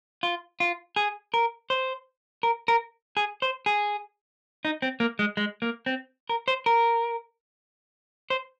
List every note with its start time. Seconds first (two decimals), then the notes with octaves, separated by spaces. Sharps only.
0.23 F4
0.60 F4
0.96 G#4
1.34 A#4
1.70 C5
2.43 A#4
2.68 A#4
3.17 G#4
3.42 C5
3.66 G#4
4.65 D#4
4.82 C4
5.00 A#3
5.19 G#3
5.37 G#3
5.62 A#3
5.86 C4
6.29 A#4
6.48 C5
6.66 A#4
8.30 C5